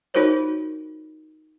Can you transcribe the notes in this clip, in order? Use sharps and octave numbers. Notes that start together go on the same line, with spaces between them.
D#4 F4 F#4 A#4 C5 C#5